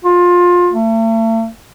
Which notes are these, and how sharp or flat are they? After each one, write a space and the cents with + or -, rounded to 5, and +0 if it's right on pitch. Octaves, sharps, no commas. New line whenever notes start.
F4 +20
A3 +40